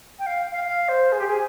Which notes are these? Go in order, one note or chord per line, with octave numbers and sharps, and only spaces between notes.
G5
F5
F5
F5
C5
G#4
G4
G#4